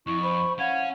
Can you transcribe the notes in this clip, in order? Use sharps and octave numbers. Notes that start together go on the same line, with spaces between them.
F2 E4 C#6
C5 B5
C#4 F5 F#5 G#6